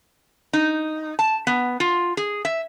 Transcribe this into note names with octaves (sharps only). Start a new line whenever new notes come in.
D#4
A5
B3
F4
G#4
E5